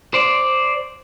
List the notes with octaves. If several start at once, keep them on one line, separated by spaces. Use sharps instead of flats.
C5 D5